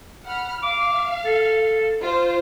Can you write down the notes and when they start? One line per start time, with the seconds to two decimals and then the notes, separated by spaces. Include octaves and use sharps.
0.25 F#5 B5 F6
0.63 F5 D6
1.25 A4
2.01 F4 C5